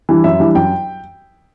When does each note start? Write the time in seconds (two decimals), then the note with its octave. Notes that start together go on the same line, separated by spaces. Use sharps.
0.09 E3 G3 D4
0.24 F#2 E5
0.40 E3 G3 D4
0.55 F#2 G5